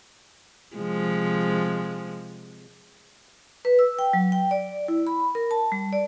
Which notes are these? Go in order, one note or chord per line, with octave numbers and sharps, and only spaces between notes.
C3 F3 G#3
B4
E6
G5
F#3
G5
D5
E4
B5
A#4
A5
G3
D5